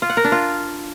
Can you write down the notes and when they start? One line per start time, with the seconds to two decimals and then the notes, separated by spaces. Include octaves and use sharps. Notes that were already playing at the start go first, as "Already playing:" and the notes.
0.02 F4
0.10 F#5
0.17 A#4
0.24 D4
0.32 F4